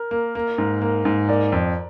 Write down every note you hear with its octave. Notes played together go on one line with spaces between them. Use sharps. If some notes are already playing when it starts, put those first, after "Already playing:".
Already playing: A#4
A#3
A#3
G#2
A#3
G#2
A#3 D5
F2